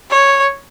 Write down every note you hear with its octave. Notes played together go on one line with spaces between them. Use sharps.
C#5